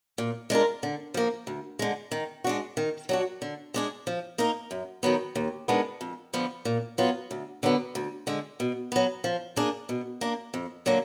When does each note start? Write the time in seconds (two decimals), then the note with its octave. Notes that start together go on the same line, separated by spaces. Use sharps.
0.18 A#2
0.50 G#3 D4 F4 A#4
0.83 D3
1.14 F3 A#3
1.47 D2
1.79 D3 G#3
2.11 D#3
2.44 G#3 D4 F#4
2.77 D#3
3.09 F#3 D4 F#4
3.42 D3
3.74 G#3 D4 G#4
4.07 F3
4.38 A#3 D#4 A#4
4.71 F#2
5.03 D#3 F#3 B3
5.36 D#2
5.68 D#3 G#3 B3 D4
6.01 F2
6.33 D3 F3 B3
6.65 A#2
6.98 F#3 B3 F4
7.31 D2
7.63 D3 F#3 B3
7.95 D2
8.27 D3 G#3
8.60 B2
8.92 F#3 B3
9.24 F3
9.56 A#3 D4 G#4
9.89 B2
10.21 A#3 D4
10.54 F2
10.86 D3 F#3 A#3